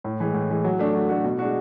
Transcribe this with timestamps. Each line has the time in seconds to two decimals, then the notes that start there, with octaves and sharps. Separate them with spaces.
0.04 A2
0.20 E3 G#3
0.34 A2
0.50 E3 G#3
0.64 F#3
0.79 A3 D4 F#4
0.94 F#3
1.09 A3 D4 F#4
1.24 B2
1.39 G#3 D4 F#4